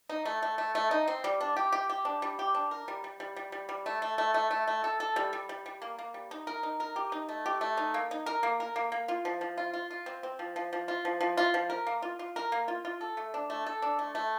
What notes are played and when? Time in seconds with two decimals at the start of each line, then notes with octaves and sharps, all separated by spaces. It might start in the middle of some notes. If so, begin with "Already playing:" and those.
0.09 D#4
0.25 A3
0.42 A3
0.58 A3
0.75 A3
0.91 D#4
1.08 C4
1.24 G3
1.41 D4
1.56 G4
1.72 G4
1.90 G4
2.05 D4
2.22 G3
2.39 G4
2.55 D4
2.71 A#4
2.88 G3
3.04 G3
3.20 G3
3.36 G3
3.52 G3
3.69 G3
3.86 A3
4.02 A3
4.18 A3
4.34 A3
4.51 A3
4.67 A3
4.84 A4
5.00 A4
5.16 G3
5.33 G3
5.49 G3
5.66 G3
5.82 A#3
5.99 A#3
6.14 G3
6.31 D#4
6.47 A#4
6.63 D#4
6.80 A#4
6.96 G4
7.12 D#4
7.29 A3
7.46 G4
7.61 A3
7.77 D#4
7.94 A#3
8.11 D#4
8.26 A#4
8.43 A#3
8.60 A#4
8.76 A#3
8.92 A#3
9.08 F4
9.25 F3
9.41 F3
9.58 F4
9.74 F4
9.90 F4
10.06 C4
10.23 C4
10.39 F3
10.56 F3
10.73 F3
10.88 F4
11.05 F3
11.20 F3
11.37 F4
11.54 F3
11.70 A#4
11.87 A#3
12.02 F4
12.19 F4
12.36 A#4
12.52 A#3
12.68 F4
12.85 F4
13.01 A4
13.17 A3
13.34 D4
13.50 A3
13.66 A4
13.82 D4
13.99 A3
14.15 A3